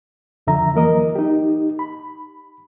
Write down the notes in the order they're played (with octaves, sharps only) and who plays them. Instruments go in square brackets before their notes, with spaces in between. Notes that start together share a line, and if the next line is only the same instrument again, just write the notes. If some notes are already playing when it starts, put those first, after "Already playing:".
[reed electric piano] C2 F2 D3 E5 A#5
E3 F#3 A#3 A#4 D#5
D#4 G4
B5